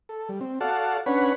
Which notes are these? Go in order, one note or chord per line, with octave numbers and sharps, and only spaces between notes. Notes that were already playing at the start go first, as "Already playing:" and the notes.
A4
G3
C4
F#4 A4 D5 F5 F#5 A5
C#4 D4 B4 C#5 F#5 B5